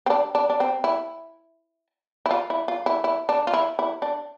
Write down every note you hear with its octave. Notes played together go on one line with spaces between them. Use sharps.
C4
D4
D4
D4
C4
E4
E4
F4
E4
F4
E4
E4
D4
F4
E4
E4
D4